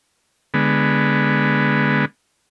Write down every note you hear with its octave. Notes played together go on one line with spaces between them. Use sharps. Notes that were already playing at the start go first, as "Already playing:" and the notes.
D3 G#3 B3